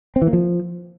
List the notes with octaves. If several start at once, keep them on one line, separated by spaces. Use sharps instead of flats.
C4
E3
A#3
F3